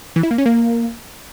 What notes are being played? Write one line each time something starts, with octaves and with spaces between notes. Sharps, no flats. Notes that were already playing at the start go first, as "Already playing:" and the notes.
E3
E4
A#3
C#4
A#3